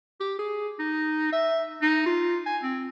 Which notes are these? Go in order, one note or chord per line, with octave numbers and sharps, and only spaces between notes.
G4
G#4
D#4
E5
D#4
F4
G#5
C4